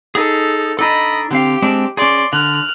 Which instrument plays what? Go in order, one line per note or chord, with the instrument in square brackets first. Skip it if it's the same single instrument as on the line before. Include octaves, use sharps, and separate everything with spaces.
[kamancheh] D#4 A4 [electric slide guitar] G#4
[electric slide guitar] D4 D#4 A4 [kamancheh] D#5 B5
[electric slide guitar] D3 C4 F5 [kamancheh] G4
[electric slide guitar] G#3 C4 D4
[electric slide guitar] C#4 G#4 [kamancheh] D5 C6
[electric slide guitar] D3 [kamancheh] F6 F#6